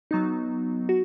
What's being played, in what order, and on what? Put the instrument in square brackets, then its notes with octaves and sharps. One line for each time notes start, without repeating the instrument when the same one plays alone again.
[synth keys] F#3 B3 D#4
F#4